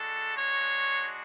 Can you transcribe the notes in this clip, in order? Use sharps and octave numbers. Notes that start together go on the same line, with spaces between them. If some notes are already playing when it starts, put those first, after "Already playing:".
Already playing: G#3 D4 F#4 A4
C#5